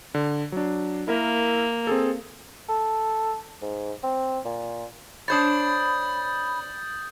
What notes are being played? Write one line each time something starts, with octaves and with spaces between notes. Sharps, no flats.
D3
F#3 D4
A#3 E4 A#4 E5
C4 G#4 A4
A4
G#2
C4
A#2
D4 C5 C#5 B5 D#6 G6 A6